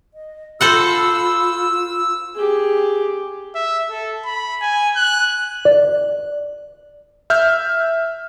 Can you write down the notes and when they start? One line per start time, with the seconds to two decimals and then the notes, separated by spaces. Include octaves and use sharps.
0.14 D#5
0.61 F4 A4 C5 F#5 B5 E6
2.35 G4 G#4
3.55 E5
3.90 A4
4.25 B5
4.62 G#5
4.96 F#6
5.65 D5
7.30 E5 F6 G6